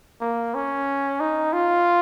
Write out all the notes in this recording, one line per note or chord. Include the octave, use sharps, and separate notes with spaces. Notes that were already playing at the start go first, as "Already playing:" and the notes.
A#3
C#4
D#4
F4